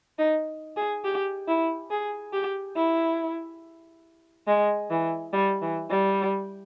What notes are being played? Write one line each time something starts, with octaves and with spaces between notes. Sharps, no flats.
D#4
G#4
G4
E4
G#4
G4
E4
G#3
E3
G3
E3
G3